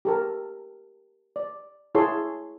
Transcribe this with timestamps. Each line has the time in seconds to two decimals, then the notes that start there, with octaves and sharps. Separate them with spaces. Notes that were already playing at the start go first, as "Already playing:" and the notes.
0.05 G4 A4 A#4
1.36 D5
1.95 E4 G#4 A4 C#5 C6